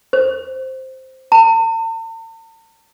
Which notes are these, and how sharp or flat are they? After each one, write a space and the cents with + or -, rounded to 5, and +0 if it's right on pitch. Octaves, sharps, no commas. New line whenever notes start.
C5 +0
A5 +45